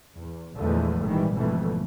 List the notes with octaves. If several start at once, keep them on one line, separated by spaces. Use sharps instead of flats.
E2
A#1 E2 D3 F3 G#3 A3
G#1 A#2 D#3 E3 G3
G#1 F2 B2 D3 E3 A3